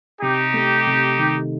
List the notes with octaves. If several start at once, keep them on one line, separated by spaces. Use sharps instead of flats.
C3 D#4 G4
A3
C3
D#3